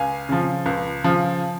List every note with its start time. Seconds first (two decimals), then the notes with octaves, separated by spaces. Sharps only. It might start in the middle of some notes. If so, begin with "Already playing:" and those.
Already playing: C#2 F5 G#5
0.29 C#3 F3
0.66 C#2
1.04 C#3 F3